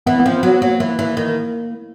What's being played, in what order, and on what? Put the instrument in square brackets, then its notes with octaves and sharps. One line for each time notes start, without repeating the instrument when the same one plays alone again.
[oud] E3 [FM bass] B3
[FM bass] B3
[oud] F3 [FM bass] C4
[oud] F#3 [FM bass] B3
[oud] F#3 [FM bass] A#3
[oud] E3
E3
D#3